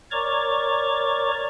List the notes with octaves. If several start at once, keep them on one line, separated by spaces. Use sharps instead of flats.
A#4 C#5 D5 A#5 C#6 D6